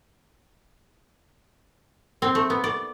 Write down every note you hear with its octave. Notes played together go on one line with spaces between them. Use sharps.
C4
A3
B3
D5